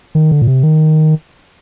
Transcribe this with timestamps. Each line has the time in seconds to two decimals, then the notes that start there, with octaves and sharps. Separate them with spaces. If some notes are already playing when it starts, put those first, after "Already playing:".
0.15 D#3
0.31 D3
0.42 A#2
0.47 C3
0.63 D#3